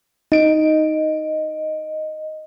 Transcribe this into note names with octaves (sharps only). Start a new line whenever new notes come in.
D#4 D#5 D7